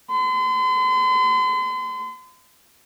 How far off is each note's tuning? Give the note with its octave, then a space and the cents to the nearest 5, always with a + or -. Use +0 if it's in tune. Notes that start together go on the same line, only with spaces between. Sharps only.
C6 -40